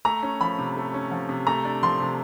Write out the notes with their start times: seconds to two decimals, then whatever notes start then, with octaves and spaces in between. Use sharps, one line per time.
0.05 A3 A#5
0.23 C#4
0.41 F3 B5
0.58 C3
0.77 A3
0.94 C#4
1.11 F3
1.29 C3
1.47 A3 A#5
1.65 D4
1.83 F3 C6
2.00 C3